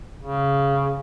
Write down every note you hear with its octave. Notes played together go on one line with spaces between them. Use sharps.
C#3